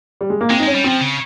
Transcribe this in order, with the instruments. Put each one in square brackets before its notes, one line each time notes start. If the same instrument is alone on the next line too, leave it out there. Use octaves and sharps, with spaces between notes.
[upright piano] G3
G#3
A#3
[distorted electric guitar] G#3 [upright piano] C4
[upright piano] D#4
[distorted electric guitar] G#3 [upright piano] C#4
[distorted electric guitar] G3
[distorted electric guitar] F3 [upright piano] C4
[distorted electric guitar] C#3